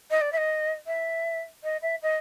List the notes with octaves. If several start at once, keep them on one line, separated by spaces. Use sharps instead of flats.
D#5
D5
E5
D#5
E5
D#5
E5
D#5